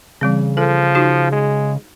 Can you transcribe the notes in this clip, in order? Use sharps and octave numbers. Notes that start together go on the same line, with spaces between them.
C#3 E3 G3 C4
F3 A4
D#4 F#4
G#3